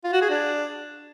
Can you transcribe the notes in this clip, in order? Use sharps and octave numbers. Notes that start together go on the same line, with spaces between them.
F4
F#4
G#4
D4